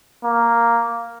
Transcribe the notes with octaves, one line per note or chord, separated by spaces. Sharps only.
A#3